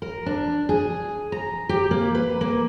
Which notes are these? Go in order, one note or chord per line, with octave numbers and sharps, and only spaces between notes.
A#4
D4
G#4
A#5
G4
A#3
B4
A#3